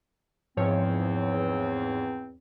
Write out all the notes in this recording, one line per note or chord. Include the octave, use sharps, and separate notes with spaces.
E2 G#2 F3 C4 C#5